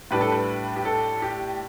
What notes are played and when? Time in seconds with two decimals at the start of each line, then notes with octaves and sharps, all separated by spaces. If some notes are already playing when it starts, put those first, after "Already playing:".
0.11 A2 G3 D4 B4
0.21 A4
0.32 B4
0.76 G4
0.85 A4
1.22 G4